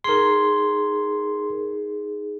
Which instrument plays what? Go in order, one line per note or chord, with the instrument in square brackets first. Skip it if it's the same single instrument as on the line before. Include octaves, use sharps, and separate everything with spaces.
[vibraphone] D#4 G#4 [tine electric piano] A#4 C6